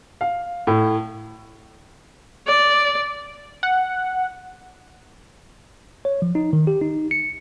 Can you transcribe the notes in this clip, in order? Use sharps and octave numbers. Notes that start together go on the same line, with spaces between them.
F5
A2
D5
F#5
C#5
F3
D#4
D#3
G4
D#4
C#7